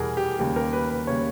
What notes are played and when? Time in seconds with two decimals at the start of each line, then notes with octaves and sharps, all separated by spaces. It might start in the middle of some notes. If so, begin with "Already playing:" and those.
Already playing: E2 B2 G3 G#4 A#4
0.17 G4
0.39 D#2 C#3 G3 A#3 G4
0.56 A#4
0.73 B4
0.90 B4
1.07 C#3 G3 A#3 C#5